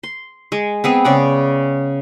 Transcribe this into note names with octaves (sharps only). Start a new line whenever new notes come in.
C6
G#3
B3 C4 G#4
C#3 D5 F#5